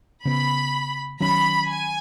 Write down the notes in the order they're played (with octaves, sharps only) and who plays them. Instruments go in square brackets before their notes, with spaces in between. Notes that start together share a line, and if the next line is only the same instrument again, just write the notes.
[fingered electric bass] C#3 B3 [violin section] B5
[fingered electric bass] D#3 F#3 C#4 [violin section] B5
[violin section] G#5